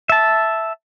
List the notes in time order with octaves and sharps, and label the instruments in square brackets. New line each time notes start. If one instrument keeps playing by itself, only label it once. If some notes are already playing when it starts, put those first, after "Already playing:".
[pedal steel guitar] E5 A5